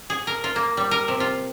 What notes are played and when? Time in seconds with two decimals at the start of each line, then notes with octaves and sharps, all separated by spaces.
0.10 G#4
0.27 A#4
0.44 F4
0.56 A#3
0.77 G3
0.91 A#4
1.08 C3
1.20 F4